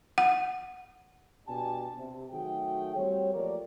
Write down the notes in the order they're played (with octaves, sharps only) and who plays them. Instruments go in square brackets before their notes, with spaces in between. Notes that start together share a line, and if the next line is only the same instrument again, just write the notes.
[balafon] F#5
[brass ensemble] B2 D4 G4 G#5 A5
C3
D#3 F#3 A3 F#4 G#4 G5
G3 A3 C4 F#4 C#5
F3 A3 A#3 G4 A#4 D5